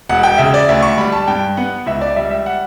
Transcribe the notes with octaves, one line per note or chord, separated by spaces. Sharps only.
E1 F#5
G5
C#3 E5
D5
D2 E5
C#6
G3 B5
A5
G2 G5
B3 F#5
C#2 E5
D5
G3 E5
E5
F#5